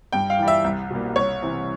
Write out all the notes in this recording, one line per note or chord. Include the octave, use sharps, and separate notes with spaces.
G2 G5
F5
E3 G3
E5
C2
B2 G3 A#3
C2 C#5
C3 E3